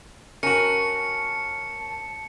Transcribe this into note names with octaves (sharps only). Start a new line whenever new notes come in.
C#4 F#4 A#4 A5 C#7